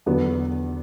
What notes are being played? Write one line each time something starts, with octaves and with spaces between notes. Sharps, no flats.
E2 D3 F#3 B3